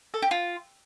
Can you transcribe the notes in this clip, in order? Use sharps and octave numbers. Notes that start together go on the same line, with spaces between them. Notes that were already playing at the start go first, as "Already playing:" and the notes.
A4
G4
F4